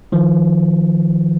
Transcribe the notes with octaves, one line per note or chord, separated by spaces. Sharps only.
D#3 F3